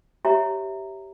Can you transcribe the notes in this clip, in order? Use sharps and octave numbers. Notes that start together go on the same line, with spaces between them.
G4 C#5 E5 G#5 A#5